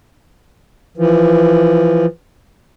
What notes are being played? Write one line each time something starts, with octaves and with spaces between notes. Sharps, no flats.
E3 F3